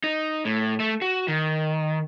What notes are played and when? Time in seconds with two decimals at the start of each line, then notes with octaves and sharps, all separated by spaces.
0.04 D#4
0.45 A2
0.80 A3
1.02 F#4
1.28 D#3